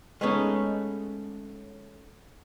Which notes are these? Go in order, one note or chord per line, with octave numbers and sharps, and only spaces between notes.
G#3 A3 B3 C#4 D#4